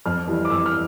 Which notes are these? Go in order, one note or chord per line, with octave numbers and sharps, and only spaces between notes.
F2 F6
E3 G3
D6
F2 E6
F6